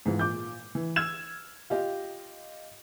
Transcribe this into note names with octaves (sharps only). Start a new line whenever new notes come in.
G#2 E3 F3
A#2 D6 G6
E3
E6 F6 G#6 E7
F4 G4 D#5